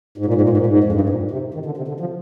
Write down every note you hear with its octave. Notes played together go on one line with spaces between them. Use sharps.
G#2
A#2
G#2
A#2
G#2
A#2
G#2
F2
G2
G#2
A#2
C3
D#3
D3
C3
D3
F3